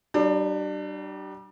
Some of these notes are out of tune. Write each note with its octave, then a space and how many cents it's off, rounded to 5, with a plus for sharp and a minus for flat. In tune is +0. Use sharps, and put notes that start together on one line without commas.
G3 -30 D4 +30